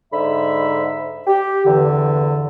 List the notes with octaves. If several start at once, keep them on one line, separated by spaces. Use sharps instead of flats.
G#2 D3 E5 B5
G4
E2 G2 D3 E3